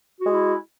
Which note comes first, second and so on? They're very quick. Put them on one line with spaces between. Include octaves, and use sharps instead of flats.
F#4 G#3 E4